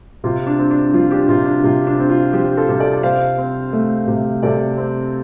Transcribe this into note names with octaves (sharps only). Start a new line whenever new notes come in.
C3 F4
D4
C4
D4
F3 F4
D4 G4
C3 F4
D4
C3 F4
D4
C4
F4
F3 G4 C5
F4 A4
C3
A4 D5
C3 C5 F5
C4
A3
C3
C3 A4 D5
C4